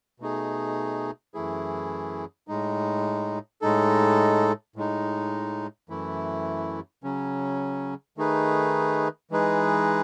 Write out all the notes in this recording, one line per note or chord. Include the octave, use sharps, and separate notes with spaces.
B2 A3 D#4 G#4
F#2 E3 A3 E4 G#4
A2 G#3 D#4
A2 G#3 D#4 A4
A2 G#3 D#4
F#2 E3 A3 E4
C#3 F#3 C#4
D#3 A3 D#4 G#4 B4
E3 G#3 D#4 G#4 B4